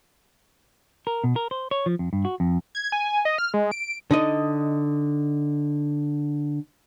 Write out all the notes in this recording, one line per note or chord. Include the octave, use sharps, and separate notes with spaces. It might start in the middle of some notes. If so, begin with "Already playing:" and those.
A#4
B2
A#4
C5
C#5
F3
F2
G2
F#4
F2
G#6
G#5
D#5
F6
G#3
D7
D3 D#4 D#5